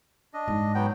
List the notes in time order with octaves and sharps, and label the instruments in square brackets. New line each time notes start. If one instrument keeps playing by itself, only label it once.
[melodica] D4 D#5
[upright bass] G#2
[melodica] F#3 B3 G5